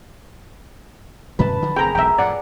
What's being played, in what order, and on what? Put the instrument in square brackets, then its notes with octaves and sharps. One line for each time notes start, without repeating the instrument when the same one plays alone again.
[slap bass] G2 C3 D#3 [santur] B4 A5
[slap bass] D3 F3
[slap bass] F1 E2 C4 [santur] G#4 A#4 [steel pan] G5 A#5
[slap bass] E1 B1 [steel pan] E5 G5
[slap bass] F2 A2 [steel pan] D5 F#5